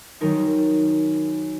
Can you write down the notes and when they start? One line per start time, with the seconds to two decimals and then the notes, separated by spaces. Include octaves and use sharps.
0.21 F#2 D#3 F#3 D#4 A#4